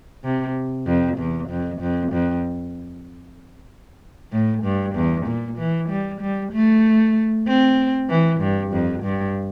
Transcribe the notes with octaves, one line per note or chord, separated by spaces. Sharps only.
C3
F2
E2
F2
F2
F2
A2
G2
E2
A#2
E3
G3
G3
A3
C4
E3
G2
F2
G2